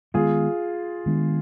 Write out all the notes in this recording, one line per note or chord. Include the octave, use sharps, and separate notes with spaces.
D#3 G#3 B3 F4 G#4
D#3 G#3 B3 D4